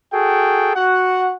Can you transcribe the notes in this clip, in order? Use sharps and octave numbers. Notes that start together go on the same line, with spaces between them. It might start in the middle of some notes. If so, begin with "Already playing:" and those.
F#4 G#4 A4 G5
F#4 F#5